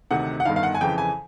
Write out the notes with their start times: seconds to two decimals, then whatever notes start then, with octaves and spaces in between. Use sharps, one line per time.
0.11 D2 C3 D#3 F#5
0.40 F#5
0.45 G1 G2 D#3 F5
0.56 F5
0.63 F#5
0.75 G#5
0.81 F2 C#3 E3 G5
0.98 G#5